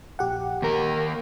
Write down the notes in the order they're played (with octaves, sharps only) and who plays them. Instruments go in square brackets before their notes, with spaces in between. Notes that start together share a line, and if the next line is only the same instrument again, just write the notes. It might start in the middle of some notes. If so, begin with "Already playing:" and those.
[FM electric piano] A#1 G4 F#5
[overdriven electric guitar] D#2 A#4